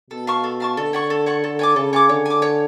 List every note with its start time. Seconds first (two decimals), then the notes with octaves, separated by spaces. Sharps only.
0.10 B2 A4
0.27 F5 A5 C#6
0.44 A4
0.60 F5 A5 C#6
0.77 D3 A4
0.93 C#5 F#5 C#6
1.10 A4
1.26 C#5 F#5 C#6
1.44 A4
1.59 C#5 G#5 D6
1.76 C#3 A4
1.93 C#5 G#5 D6
2.09 D3 C#5
2.26 G#5 D6
2.42 C#5